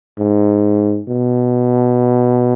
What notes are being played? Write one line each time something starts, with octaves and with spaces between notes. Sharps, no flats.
G#2
B2